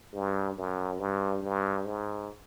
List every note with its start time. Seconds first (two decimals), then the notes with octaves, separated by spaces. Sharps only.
0.14 G2
0.56 F#2
0.99 G2
1.42 G2
1.85 G#2